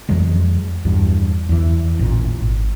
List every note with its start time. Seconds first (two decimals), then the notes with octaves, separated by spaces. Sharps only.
0.09 F2 E3 F#3 G#3
0.85 E2 G2
1.49 E2 E3
1.99 A1 A#2
2.40 G#1